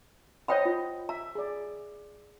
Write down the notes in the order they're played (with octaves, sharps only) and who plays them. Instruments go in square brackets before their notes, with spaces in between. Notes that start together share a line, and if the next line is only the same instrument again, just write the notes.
[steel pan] C5 D#5 F#5 [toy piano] C#5 G5 B5
[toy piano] F4
[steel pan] E5 [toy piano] A#5
[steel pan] G#4 D5